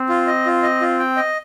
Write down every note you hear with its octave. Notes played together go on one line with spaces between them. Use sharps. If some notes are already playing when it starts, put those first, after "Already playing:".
Already playing: C4
F4
D#5
F4
D#5
F4
G5
D#5